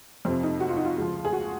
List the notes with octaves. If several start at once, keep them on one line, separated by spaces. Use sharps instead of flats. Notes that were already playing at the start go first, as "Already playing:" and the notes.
F2 C3 F3 C4
D#4
F#4
F4
D#4
F4
C#2 C#3 F3
G#4
F#4